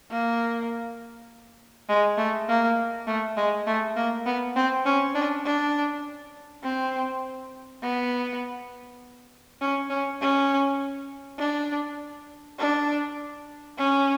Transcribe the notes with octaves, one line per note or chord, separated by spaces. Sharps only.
A#3
G#3
A3
A#3
A3
G#3
A3
A#3
B3
C4
C#4
D4
D4
C4
B3
C#4
C#4
C#4
D4
D4
C#4